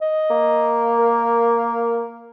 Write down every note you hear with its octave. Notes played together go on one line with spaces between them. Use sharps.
D#5
A#3
A#4